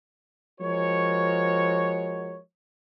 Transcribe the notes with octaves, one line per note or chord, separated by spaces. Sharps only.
F3 G#3 F#4 A#4 C#5